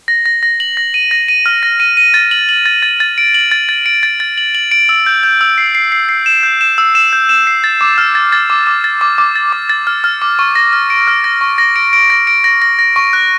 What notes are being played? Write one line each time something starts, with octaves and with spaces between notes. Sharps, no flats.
A#6
A#6
A#6
F#7
A#6
D#7
A#6
D#7
F6
A#6
D#7
D#7
A6
F#7
F#7
A6
A6
A6
D7
F#7
A6
A6
D7
A6
A6
F#7
F#7
D7
E6
G6
G6
E6
C7
C7
C7
C7
E7
G6
E7
E6
E7
G6
E7
C7
A6
D6
F6
A6
A6
D6
D6
A6
D6
D6
A6
D6
A6
F6
F6
D6
C#6
A#6
F6
D7
F6
A#6
C#6
A#6
D7
D7
A#6
D7
A#6
A#6
A#6
C#6
F#6